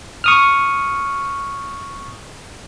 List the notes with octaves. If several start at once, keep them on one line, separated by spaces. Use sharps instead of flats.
C#6 D#6 F6